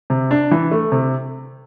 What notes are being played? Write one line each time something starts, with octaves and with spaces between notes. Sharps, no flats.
C3
D4
E3
A3
C3